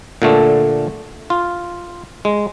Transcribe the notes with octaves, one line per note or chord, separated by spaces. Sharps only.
A#2 D3 A3
F4
G#3